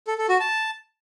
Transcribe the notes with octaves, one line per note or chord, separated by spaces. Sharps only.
A4
A4
F#4
A5